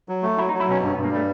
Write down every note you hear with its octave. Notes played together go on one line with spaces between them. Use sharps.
F#3
A3
F#3 E4
D#4
F#3
E4
B2 C#4
G2
B3
G2
A#3
G3 A3